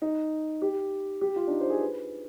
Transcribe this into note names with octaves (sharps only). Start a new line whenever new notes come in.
D#4
G4
G4
F4
D4
D#4
C5
G#4
B4